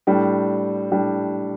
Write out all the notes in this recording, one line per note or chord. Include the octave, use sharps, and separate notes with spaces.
A2 G3 D4
A2 G3 D4